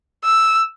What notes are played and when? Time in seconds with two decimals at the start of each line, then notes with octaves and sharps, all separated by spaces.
0.25 E6